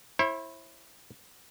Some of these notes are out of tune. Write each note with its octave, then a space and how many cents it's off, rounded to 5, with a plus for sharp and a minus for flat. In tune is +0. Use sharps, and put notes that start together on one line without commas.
E4 +0 C5 +45